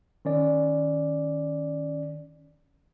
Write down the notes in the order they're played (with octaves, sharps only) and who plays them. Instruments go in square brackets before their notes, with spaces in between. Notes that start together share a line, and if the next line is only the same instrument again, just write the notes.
[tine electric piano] D#3 C#4 D5